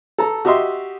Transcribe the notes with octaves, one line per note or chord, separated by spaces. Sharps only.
A4 A#5
F#4 G4 D#5 E5 C6